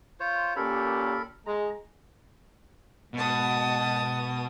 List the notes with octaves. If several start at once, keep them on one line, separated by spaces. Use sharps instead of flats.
F4 C5 C#5
A#2 C#4 G4 A4 A#4 B5
G#3 A#5
G#2 B2 A5 D#6